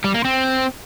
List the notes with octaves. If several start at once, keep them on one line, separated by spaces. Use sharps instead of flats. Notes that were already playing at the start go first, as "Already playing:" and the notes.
G3
A#3
C4